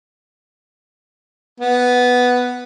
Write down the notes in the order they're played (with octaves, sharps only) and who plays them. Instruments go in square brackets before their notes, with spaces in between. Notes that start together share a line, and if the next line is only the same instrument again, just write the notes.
[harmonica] B3